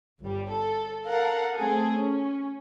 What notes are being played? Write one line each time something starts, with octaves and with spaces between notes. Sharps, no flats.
G1 G3
A4
A4 A#4 F5 F#5
A3 C4 G#4 A4
C#4